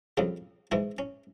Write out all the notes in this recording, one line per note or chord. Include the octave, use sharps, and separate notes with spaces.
F2 C#3 G3 F4
G#2 E3 G#3 E4
C#4